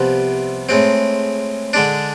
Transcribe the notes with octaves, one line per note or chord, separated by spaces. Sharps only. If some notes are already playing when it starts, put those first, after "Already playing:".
Already playing: C2 C3 F3 B3
A2 G#3 C4
D3 G#3 D4